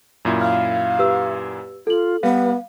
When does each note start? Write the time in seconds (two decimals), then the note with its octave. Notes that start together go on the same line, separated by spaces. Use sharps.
0.25 F#2 A#2 E4
0.41 F5 F6
0.99 G4 B4 E6
1.87 F4 A4 F#7
2.23 G3 B3 B4 F5